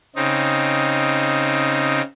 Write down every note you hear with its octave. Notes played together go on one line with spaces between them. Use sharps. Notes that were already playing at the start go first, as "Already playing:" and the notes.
C#3 C4 D#4